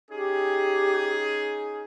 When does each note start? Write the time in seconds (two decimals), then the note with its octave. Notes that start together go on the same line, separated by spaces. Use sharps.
0.11 C#4 D#4 G4 G#4